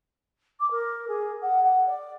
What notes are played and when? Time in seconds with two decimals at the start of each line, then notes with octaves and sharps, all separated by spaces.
0.60 D6
0.71 A#4
1.08 G#4
1.42 F#5
1.64 F#5
1.87 D5